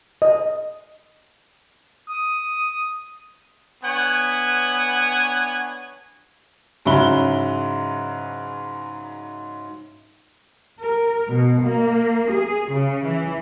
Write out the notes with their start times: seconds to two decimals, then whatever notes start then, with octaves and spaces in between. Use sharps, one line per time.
0.22 D#5
2.09 D#6
3.84 B3 D4 C#5 F#5 G#5
6.85 G#2 C#3 F#3 E4 B5 G7
10.80 A#4
11.29 B2
11.63 A#3
12.32 G#4
12.73 C#3
13.05 E3